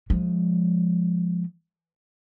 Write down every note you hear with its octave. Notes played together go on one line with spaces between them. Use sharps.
F3 G#3